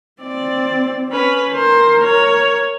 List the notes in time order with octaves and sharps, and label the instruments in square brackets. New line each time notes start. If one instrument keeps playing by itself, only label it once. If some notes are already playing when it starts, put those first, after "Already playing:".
[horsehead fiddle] C4 [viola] D5
[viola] C#4 B4
[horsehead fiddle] A#4 [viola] C5
[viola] C#5